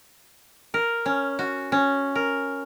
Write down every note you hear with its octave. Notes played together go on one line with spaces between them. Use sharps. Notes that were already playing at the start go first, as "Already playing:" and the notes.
A#4
C#4
F#4
C#4
A#4